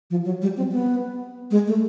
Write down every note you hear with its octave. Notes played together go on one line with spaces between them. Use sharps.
F3
F#3
G3
C4
B3
G#3
A3